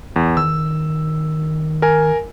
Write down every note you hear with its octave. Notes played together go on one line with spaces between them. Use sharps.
E2
D#3 E6
A#4 G#5